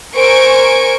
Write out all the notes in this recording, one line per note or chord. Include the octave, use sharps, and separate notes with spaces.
A#4 C5 G#5 C#6 D7